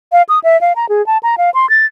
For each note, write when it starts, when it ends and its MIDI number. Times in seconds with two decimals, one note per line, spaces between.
0.12 0.22 77
0.29 0.39 87
0.44 0.59 76
0.61 0.73 77
0.76 0.89 82
0.89 1.05 68
1.07 1.18 81
1.23 1.35 82
1.38 1.50 77
1.54 1.69 84
1.70 1.86 93